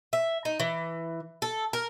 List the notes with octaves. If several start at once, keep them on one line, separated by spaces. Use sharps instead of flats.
E5
D#4
E3
A4
A#4